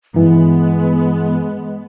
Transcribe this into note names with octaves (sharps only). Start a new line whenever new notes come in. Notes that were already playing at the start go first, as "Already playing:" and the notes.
G2 E3 G#3 B3